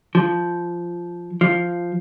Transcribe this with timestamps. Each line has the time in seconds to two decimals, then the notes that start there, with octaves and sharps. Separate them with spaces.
0.15 F3
1.41 F3